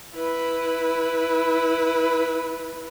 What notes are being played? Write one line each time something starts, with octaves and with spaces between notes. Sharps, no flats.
E4 B4